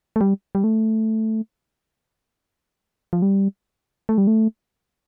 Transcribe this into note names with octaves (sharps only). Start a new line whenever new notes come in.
A3
G3
G3
A3
F3
G3
A3
G3
A3